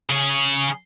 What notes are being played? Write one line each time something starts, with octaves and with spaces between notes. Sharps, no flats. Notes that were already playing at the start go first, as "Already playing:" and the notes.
C#3 G#4